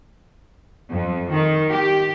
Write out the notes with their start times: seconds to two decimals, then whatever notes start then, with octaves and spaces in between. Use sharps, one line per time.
0.90 F2
1.31 D#3
1.70 G4